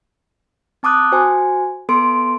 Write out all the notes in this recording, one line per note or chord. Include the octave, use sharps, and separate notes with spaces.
C4 A5 D6 D#6 F#6
F#4 C5 G#5
B3 A4 C6 D7